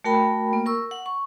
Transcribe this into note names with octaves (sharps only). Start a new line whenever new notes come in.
A3 F#4 A#4 G5 B5
A#3
A#4 C#6 E6
F#5
C#6